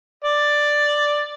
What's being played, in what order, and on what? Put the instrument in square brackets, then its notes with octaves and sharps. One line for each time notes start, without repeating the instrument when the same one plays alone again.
[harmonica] D5